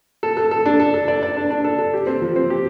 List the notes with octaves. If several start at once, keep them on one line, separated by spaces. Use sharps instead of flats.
A4
A4
A4
D4
A4
A4
D5
D5
D4
D4
A4
A4
G4
C4
F3
C4
G4